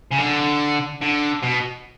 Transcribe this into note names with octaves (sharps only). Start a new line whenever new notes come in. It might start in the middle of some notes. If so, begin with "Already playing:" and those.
C#3
D3
D3
B2